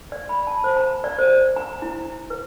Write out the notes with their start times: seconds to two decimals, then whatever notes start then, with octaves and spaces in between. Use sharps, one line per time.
0.12 D5
0.29 B5
0.47 A5
0.64 C5
0.77 A#5
1.04 D5
1.19 C5
1.56 A#5
1.82 E4
2.30 B4